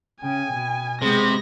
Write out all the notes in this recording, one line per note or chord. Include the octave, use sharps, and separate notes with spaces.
C#3 G5 G#5
B2
C3 G#3 B3 G#4 A#6